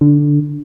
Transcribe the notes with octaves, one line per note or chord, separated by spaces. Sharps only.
D3